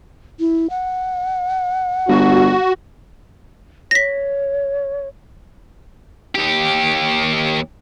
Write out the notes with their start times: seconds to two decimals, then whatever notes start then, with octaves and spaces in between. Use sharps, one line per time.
0.40 E4
0.70 F#5
2.08 G1 F#4
3.91 C#5 A#6 B6
6.35 D#2 G4